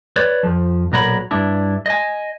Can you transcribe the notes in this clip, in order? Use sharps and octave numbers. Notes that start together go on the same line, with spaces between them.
B4 C#5 D5
F2 F3
B1 A#2 F#4 A#4 C#5 B5
G2 D4 E4
D#5 G#5